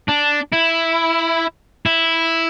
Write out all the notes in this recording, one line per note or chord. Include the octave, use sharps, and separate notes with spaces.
D4
E4
E4